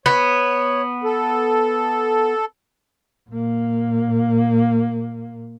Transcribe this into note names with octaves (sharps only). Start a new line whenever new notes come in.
B3 C#5
A4
A#2 A#3